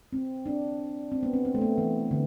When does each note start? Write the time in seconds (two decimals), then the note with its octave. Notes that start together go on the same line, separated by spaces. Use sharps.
0.13 C4
0.46 D4
1.12 C4
1.23 B3
1.34 C4
1.45 C4
1.55 A3
1.61 B3
1.78 E3
2.11 D3